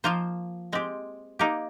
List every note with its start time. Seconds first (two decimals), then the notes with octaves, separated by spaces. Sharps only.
0.04 F3 A#3 F4 C5
0.73 G#3 C4 G4
1.39 A#3 D#4 G4